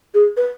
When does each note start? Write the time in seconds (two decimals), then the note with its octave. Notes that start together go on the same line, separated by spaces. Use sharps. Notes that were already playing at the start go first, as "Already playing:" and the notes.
0.14 G#4
0.37 B4